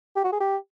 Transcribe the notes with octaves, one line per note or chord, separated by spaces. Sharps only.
G4
F#4
G#4
G4